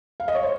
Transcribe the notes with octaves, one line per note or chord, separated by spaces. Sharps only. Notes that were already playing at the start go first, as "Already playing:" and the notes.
F5
D#5
C#5
C5